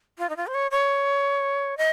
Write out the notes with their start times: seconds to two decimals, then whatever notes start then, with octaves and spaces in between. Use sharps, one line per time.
0.18 F4
0.30 D#4
0.37 F4
0.47 C5
0.54 C#5
0.71 C#5
1.77 D#5